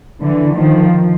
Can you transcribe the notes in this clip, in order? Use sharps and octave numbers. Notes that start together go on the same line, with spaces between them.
D3 E3
D#3 F3